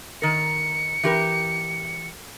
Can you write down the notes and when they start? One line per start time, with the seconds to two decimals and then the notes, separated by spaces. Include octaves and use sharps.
0.22 D#3 A#4 C#7
1.03 E3 G4 A#4